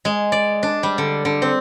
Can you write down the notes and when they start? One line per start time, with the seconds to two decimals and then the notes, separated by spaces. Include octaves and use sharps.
0.05 G#3
0.32 D5
0.63 D4
0.83 G3
0.98 D3
1.25 D3
1.42 C4